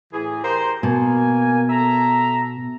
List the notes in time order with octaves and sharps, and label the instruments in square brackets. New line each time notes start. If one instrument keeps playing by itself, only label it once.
[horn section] A2 E3 G#4
G4 A#4 C5
[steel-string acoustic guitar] B2 [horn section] A#3 G#5
[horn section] A4 E5 A#5